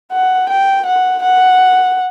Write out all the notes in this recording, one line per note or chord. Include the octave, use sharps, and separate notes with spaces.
F#5
G5
F#5
F#5